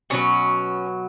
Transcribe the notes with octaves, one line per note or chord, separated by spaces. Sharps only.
B2 F#3 C#4